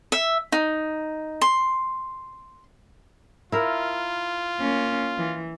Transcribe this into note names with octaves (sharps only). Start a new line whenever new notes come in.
E5
D#4
C6
E4 F4 A#4
A#3 C#4
E3